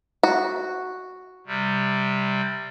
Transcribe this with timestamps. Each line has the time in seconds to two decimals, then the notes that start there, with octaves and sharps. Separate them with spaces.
0.23 F#4
1.47 C3 G3